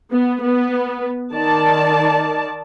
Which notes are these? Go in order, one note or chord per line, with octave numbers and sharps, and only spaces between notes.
B3
B3 B4
D#3 D5 A5